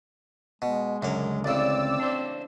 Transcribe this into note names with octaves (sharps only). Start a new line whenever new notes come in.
B2 G#3
C#2 F#2 D3 A#4 D5
A1 C#3 C4 D5 E6
D4 C5